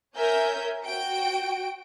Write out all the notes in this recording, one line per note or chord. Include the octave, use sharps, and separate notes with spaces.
A#4 C#5 E5 G#5 G6
F#4 G5 D7